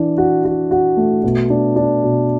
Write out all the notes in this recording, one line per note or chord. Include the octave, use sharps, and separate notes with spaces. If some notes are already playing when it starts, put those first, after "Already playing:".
Already playing: E3 D4
F#4
F#4
F#4
A3
B2
D4
D4
B2